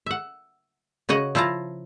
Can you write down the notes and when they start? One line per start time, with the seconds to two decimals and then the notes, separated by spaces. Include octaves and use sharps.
0.06 E5 F#5
1.09 C#3 F#4 C#5 D#5 F#5
1.35 F3 E4 F4 A5 A#5